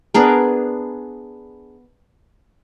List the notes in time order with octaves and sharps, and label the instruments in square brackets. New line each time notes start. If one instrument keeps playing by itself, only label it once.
[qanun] B3 D4 G#4 A#4